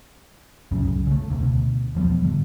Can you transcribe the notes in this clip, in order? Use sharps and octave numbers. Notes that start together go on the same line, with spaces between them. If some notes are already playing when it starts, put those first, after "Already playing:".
C2 F#2 A2 C#3
C#3 A3
E1 D2 C3
D2 B2
E1 F3 G3 B3
G#2 D3